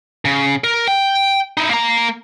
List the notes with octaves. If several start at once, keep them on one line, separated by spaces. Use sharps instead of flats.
C#3
A#4
G5
D#4 E4
A#3 A#5